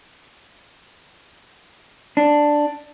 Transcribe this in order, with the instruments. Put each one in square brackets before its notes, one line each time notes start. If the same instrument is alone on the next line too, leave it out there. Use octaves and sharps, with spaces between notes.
[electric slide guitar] D4